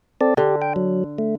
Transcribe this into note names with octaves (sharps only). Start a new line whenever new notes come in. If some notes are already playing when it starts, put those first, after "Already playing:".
C4 A4 D5
D3 G4
G5
F#3
A3